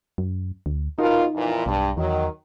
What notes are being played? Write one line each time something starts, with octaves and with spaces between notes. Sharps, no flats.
F#2
D2
B2 D#4 F4 A#4
F2 A#2 E3
B1 G2
E2 D#3 F#3